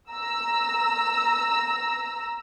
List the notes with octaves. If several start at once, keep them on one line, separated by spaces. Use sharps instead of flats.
A#5 E6